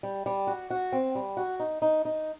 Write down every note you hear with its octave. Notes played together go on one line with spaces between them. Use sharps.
G3
G3
F#4
F#4
C4
G3
F#4
D#4
D#4
D#4